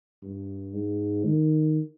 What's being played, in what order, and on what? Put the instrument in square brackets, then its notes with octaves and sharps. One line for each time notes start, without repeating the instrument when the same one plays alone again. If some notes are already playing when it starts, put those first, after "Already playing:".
[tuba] G2
G#2
D#3